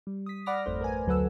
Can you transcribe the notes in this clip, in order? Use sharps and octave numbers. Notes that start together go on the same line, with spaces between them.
G3
D#6 B6
D5 F#5 B5 D6 F6 A#6
G#1 F2 A3 C5
A#4 B4 G#5
D2 F#3 A4 B4 F#5 E6